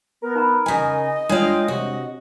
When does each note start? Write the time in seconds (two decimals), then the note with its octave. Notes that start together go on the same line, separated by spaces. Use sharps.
0.22 B3 A#4
0.35 D#4 A#5 B5
0.66 C#3 D#5 G#5
1.29 G#3 D4 F4 C#5 D5 G5
1.68 C3 F#4